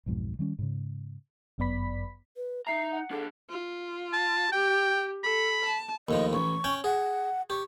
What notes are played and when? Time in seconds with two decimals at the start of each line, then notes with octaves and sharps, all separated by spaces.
0.06 B1 F2 G#2 B2
0.39 D#3 G3 C#4
0.59 G#2 C#3
1.58 G1 F#2 B3 D5 B5 B6
2.37 B4
2.67 D#4 E5 A#5 C7
2.92 F#5
3.11 D4 G#4 A4
3.50 F4
4.13 A5
4.52 G4 G5
5.24 A4 B5
5.66 A5
6.09 D#2 A2 F3 D#5
6.33 A1 C#6
6.64 C#4 G5 G#5
6.84 G#4 F#5
7.50 G4 C#6